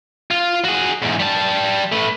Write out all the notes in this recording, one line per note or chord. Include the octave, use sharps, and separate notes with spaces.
F4
F#4 G#4
E2 G#2
G3 A5
A3 B4